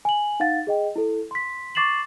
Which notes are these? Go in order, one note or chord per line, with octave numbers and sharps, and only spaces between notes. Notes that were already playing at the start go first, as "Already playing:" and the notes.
G#5 F#7
D#4 F5 F#5 A6
G#4 D#5 G5
E4 A4
C6 B6
C#6 D6 A6 C7 E7 F#7